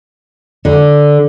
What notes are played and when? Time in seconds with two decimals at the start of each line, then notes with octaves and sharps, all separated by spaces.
0.65 D3